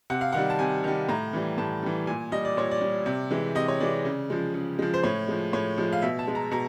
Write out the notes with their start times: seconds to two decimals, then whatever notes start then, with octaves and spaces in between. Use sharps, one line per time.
0.10 C3 F#5
0.21 F5
0.33 D#3 G3 F#5
0.50 A5
0.59 C3 G#5
0.84 D#3 G3
1.09 A2 A#5
1.33 E3 G3
1.58 A2 A5
1.83 E3 G3
2.07 A#2 G#5
2.32 G3 D#5
2.45 D5
2.57 A#2 C#5
2.71 D5
2.81 G3
3.06 C3
3.31 E3 G#3
3.55 C3 D#5
3.68 C#5
3.80 E3 G#3 D5
4.05 C#3
4.30 F3 G#3
4.54 C#3
4.79 F3 G#3
4.94 C5
5.03 A2 C#5
5.28 F3 G#3
5.53 A2 C#5
5.78 F3 G#3
5.92 F5
6.02 B2 E5
6.19 A5
6.27 G#3
6.35 A#5
6.51 B2 A#5